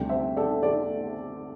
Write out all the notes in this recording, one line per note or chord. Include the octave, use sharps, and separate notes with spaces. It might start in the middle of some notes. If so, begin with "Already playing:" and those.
Already playing: D2 C3 G3 D5 G5
C5 E5
A4 D5
A4 D5